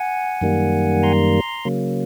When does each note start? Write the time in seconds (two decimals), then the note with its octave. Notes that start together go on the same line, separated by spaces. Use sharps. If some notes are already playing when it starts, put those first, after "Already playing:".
Already playing: F#5 G#5
0.41 F#2 D#3 G3 A#3
1.03 A#5 C6
1.65 C#3 F#3 A#3